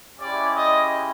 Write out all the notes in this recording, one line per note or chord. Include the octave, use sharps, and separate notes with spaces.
G#3 C#4 E4 G4 D5
D#5